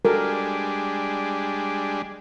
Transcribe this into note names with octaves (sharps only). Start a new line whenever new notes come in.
G3 G#3 D4 F#4 A4 A#4